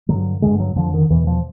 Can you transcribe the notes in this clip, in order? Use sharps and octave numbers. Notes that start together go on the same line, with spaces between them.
G2 D3 F#3
G2 D3 G#3
F#3
F2 D3 F3
D#3
E2 B2 E3
F3